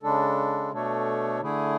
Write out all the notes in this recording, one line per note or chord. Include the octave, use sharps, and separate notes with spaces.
C#3 G#3 D4 A4
B2 A3 D4 A4 C#5
D3 A3 E4 G#4